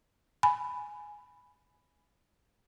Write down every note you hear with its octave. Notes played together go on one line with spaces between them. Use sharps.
G#5 B5